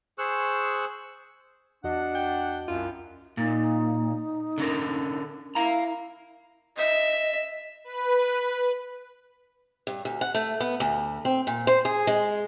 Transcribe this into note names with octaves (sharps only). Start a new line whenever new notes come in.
G#4 C5 C#6 E6 F#6
E2 D4 F#4 D#5 F#5
G5
C2 F#2 F4
A#2 D#4
D3 C#4 A#4
E4 F5 A#5
D#5 E5
B4
G2
D2
F#5
A3
B3
D2
C4
A#2
C5
G#4
G#3